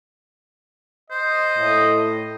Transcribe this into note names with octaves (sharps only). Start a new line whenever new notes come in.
C5 D#5
A2